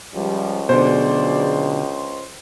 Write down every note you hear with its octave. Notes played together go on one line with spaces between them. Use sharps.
C#2 F3 G3
B2 D3 F#3 G#4 C5 D5